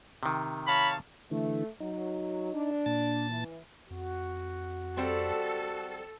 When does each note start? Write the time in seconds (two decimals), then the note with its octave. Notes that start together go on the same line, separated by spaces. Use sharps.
0.23 C3 D#3
0.67 C#5 F5 A5 B5
1.31 D3 E3 A3
1.80 F#3 D#4
2.53 D4
2.86 A#2 A5 A6
3.30 E3
3.90 F2 F#4
4.97 G3 C4 A4